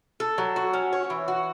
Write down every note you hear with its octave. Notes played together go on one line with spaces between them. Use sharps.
A4
F#3
F#4
C#4
C#5
E3
F#4